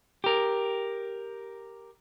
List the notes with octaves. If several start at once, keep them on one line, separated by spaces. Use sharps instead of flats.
G4 A#4